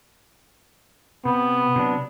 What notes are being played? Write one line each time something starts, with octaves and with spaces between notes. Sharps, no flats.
C3 B3
C3 F#3 D4